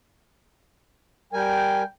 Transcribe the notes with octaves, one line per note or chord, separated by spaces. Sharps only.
G3 A#4 G5 G#5